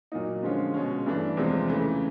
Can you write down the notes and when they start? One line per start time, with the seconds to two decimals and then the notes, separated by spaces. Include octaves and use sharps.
0.12 A#2 F#3 A#3 D#4
0.43 D3 F3 G#3 C#4 F4
0.74 B2 G#3 C#4
1.06 G2 E3 A3 D4
1.37 E2 C3 F3 G#3
1.68 C#3 E3 A3